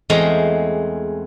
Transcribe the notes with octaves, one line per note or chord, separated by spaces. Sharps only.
E2 G#3 A3 C4 C5 A#5